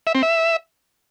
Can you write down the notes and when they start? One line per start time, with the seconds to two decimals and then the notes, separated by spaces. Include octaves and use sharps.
0.07 E5
0.15 C4
0.23 E5